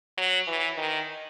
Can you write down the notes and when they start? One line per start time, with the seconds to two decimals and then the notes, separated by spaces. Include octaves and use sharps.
0.18 F#3
0.47 E3
0.78 D#3